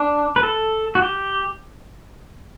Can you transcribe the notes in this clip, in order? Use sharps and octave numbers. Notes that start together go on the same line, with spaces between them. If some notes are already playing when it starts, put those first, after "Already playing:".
Already playing: D4
B4
A4
F#4
G4